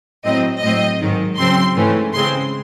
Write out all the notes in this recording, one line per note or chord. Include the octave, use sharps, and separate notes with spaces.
A2 F#3 C4 D#5
A2 F#3 C4 D#5
G#2 D#3 F#3
C#3 F#3 C4 C6
G#2 E3 A3 C#4
C#3 G#3 C4 C6